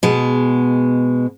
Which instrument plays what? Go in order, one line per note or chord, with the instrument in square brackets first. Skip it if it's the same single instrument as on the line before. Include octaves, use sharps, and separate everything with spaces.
[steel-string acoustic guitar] B2 G#3